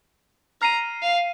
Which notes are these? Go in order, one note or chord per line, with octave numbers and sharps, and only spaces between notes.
A#5 F6 C7 D#7
F5